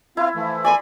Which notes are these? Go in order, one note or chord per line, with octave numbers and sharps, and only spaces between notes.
C4 E4 F4 F5
E3 F3 A3
D5 G#5 B5 C6